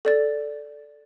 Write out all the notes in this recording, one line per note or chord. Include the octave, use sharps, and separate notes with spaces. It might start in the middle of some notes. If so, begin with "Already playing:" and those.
A4 D5 A6